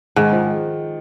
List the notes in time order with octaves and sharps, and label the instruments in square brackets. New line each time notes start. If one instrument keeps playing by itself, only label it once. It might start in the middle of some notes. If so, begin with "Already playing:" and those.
[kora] G#2 [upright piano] D#3
[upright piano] F3